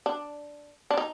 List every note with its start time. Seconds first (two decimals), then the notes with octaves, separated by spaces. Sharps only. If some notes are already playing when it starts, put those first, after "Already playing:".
0.06 D4
0.91 D4
0.97 D#4